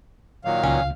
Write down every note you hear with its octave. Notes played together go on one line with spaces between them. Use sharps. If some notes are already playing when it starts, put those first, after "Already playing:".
A#2 D#3 F#3 F5
C#2 C#4